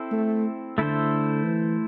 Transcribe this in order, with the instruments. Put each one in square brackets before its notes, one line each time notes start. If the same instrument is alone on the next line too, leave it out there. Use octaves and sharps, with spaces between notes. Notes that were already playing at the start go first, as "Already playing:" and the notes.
Already playing: [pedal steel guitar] C4 E4 A4 C5
[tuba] A3
[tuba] D3 [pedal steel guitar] A3 E4 A4 C5
[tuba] E3